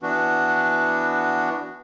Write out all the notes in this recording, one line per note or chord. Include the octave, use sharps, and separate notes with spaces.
E3 B3 D4 F#4